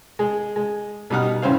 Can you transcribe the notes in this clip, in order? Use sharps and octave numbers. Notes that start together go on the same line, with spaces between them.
G#3 G#4
G#3
B2 G3 D#4 F#5 F6
G2 C#3 E3 C5 C#5 F5